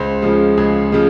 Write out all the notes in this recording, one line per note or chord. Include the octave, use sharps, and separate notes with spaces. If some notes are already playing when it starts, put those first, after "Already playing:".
Already playing: C#2 C5
C#3 F3 G#3
C#2 G#4
C#3 F3 G#3